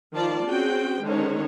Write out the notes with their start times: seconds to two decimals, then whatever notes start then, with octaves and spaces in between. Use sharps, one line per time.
0.14 D#3 F3 F4 D5 A5
0.45 C4 C#4 F#4 G#4 G5
1.04 D3 D#3 G#3 C#4 C5 C#5